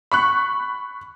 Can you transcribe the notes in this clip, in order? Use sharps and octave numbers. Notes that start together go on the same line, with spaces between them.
B5 C#6 F#6